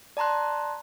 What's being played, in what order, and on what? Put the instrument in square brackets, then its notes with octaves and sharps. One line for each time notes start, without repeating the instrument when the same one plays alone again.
[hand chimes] D5 A5 A#5 C6 F#6